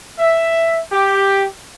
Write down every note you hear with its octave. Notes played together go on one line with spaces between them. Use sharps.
E5
G4